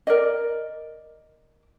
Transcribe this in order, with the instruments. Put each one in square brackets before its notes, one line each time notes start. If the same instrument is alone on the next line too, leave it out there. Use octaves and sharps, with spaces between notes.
[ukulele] A#4 D5 D#5